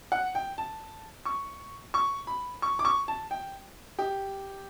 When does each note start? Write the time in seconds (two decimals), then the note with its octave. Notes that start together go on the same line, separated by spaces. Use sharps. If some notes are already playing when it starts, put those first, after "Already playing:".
0.12 F#5
0.35 G5
0.58 A5
1.25 C#6
1.94 C#6
2.27 B5
2.62 C#6
2.79 D6
2.85 C#6
3.08 A5
3.31 G5
3.99 G4